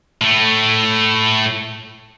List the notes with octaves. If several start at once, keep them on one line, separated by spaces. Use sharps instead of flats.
A2 A3